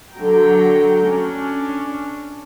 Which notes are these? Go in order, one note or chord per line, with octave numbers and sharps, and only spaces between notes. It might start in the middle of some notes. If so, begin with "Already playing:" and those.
D3 F#3 F#4 G5 A#5
C#4 D4